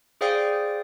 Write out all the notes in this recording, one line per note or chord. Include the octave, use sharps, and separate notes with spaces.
G#4 C5 D5 F5 G5 D#6